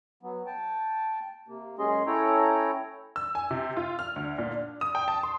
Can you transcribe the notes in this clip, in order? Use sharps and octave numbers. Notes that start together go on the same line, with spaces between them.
F#3 B3
G5 A5
C3 A#3
F#2 G#3 C#4 G#4 D#5 C6
C#4 E4 A4 C#5 G5 A#5
E6
G#5
C3
F4
F6
D2
A#2
D4
D#6
G5
A5
C6